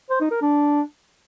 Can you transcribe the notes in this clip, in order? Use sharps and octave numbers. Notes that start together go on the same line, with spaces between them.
C5
D#4
A#4
D4